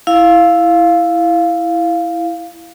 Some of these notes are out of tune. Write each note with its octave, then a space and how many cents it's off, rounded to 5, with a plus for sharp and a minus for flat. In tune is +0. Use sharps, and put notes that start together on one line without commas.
E4 +0 F5 +0